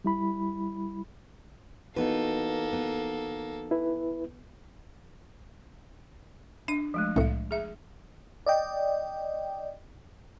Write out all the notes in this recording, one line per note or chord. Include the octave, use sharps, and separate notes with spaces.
G3 E4 B5
E3 A#3 B3 D#4 F#4 A4 B4
B3
E4 B4
D4 D#7
F3 G#3 A3
C2 A2 E5 F5
G#4 E5
D5 D#5 G5